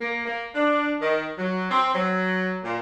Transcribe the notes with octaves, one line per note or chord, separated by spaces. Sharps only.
A#3
A#3
D4
D#3
F#3
C4
F#3
A#2